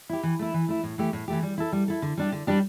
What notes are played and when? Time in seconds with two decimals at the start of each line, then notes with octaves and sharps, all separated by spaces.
0.09 E4 G4
0.23 E3
0.39 A3 E4
0.54 E3
0.69 A3 E4
0.83 A2
0.98 E3 A3 G4
1.13 A2
1.28 E3 A3 G4
1.43 G3
1.58 E4 A4
1.72 G3
1.88 E4 A4
2.02 D3
2.17 G3 D4 G4
2.32 D3
2.47 G3 D4 G4